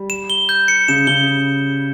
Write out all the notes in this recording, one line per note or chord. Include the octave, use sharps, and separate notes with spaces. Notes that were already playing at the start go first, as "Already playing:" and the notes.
Already playing: G3
E7
G7
G6
C#7
C#3 E7
C#3 G7